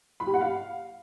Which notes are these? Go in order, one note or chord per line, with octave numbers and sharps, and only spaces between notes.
B5
G4
F#5
F5